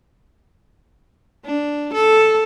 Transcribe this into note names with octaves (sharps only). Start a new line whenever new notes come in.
D4
A4